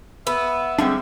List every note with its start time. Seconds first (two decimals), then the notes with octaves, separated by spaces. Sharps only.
0.27 B3 E5
0.78 D3 G3 G#3 C4 D4